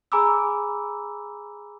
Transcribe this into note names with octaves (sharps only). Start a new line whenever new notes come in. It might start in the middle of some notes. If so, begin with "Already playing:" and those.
G#4 G#5 A#5 B5 D6 E6